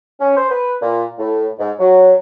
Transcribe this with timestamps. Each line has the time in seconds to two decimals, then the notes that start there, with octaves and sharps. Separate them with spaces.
0.20 C#4
0.36 C5
0.51 B4
0.81 A#2
1.19 A2
1.59 G#2
1.79 F#3